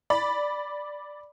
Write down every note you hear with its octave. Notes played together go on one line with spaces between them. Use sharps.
D5 B5